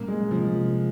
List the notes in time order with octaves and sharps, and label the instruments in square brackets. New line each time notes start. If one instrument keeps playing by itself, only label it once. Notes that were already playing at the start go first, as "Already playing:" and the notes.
Already playing: [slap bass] A#2 G3 C#4 [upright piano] A#3
[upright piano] G#3
[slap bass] C3 G3 C#4 [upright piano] F3